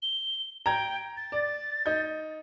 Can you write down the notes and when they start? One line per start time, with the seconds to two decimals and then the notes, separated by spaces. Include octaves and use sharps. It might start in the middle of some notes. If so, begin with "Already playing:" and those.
0.02 G7
0.66 G5 A#5 G#6
1.17 A6
1.32 D5
1.86 D#4 G6